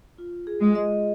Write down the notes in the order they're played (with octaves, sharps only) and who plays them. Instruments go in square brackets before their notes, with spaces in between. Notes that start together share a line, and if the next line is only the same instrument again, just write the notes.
[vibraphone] F4
G#4
[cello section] G#3
[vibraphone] D#5